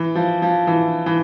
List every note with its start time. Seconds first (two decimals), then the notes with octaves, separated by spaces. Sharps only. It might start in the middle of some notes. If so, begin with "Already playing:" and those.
Already playing: E3
0.15 F3
0.42 F3
0.67 E3
1.06 E3